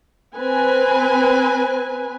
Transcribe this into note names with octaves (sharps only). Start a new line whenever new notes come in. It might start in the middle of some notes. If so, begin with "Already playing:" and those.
C4 B4 G#5